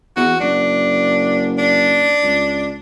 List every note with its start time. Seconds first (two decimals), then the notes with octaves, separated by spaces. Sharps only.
0.16 E2 F#4
0.40 F#1 D4
1.58 D4
2.23 C#2